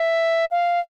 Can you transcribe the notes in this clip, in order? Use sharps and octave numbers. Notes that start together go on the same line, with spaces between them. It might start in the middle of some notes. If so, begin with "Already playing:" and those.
Already playing: E5
F5